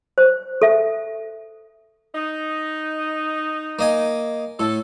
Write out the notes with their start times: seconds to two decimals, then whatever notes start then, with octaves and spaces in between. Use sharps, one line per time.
0.18 C5
0.62 A4 E5
2.15 D#4
3.79 A#3 D#5 G#5
4.60 A2 A4